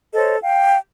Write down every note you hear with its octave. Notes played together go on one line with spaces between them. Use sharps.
A4 C5 C#5 D#5
F5 G5